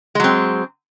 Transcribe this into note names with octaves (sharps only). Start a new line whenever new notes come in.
F#3 G#3 C4